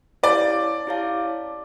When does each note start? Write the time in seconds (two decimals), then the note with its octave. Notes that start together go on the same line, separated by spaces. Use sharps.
0.23 E4 G4 C#5 D5 F5 A5
0.87 E4 G4 C#5 F5 A5